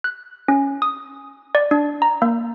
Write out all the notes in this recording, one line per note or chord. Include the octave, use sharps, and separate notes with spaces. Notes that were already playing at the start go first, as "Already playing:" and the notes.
F#6
C#4
D#6
D5
D4
A#5
A#3